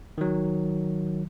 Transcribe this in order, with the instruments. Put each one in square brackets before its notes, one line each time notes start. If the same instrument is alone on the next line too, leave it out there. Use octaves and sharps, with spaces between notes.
[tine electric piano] D#3 F#3